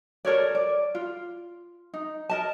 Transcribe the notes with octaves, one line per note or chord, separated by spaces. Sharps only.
A4 A#4 C#5 D5
D5
F4
D#4
A#4 D#5 A5